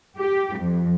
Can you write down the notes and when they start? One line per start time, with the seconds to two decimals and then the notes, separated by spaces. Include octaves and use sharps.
0.18 G4
0.58 F2